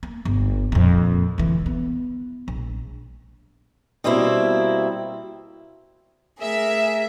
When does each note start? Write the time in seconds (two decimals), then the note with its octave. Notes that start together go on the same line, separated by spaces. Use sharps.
0.03 A#3
0.25 G1
0.72 F2 A#2
1.38 D3 E3
1.66 B3
2.48 A#1
4.04 B2 G3 A#3 C4 E4
6.40 A3 G#4 A#4 E5